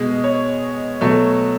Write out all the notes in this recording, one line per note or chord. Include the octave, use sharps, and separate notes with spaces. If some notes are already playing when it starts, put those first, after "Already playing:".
Already playing: B2 G#3
C#5
B2 F#3 A3